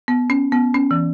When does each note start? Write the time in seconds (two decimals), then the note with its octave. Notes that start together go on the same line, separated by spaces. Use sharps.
0.08 B3
0.30 C#4
0.52 B3
0.74 C#4
0.91 E3